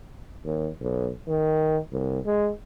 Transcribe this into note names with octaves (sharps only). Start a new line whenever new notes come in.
D#2
B1
D#3
C2
G#3